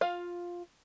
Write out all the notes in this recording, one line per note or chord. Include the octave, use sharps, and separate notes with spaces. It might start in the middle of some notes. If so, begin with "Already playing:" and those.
F4 F5